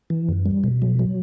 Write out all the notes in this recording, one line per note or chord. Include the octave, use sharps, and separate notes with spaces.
E3
F#2
G3
B2
F#3
F#3